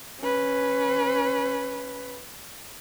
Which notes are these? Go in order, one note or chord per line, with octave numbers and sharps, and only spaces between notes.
C#4 B4